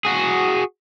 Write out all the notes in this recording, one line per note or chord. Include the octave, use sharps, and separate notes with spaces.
F#4 G#4